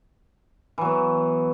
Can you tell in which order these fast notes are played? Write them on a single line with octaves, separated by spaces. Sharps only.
E3 F#3 B3